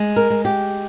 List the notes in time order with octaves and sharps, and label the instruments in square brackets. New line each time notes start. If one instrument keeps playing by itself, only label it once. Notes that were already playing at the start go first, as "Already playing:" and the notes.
Already playing: [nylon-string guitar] G#3
A#4
G#3
G4